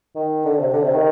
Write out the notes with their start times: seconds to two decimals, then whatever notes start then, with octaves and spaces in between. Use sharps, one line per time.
0.15 D#3
0.45 D3
0.59 C3
0.73 D3
0.84 C3
0.93 D#3